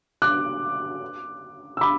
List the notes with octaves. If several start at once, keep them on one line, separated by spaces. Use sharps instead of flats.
D6 F#6
E6
B5 D6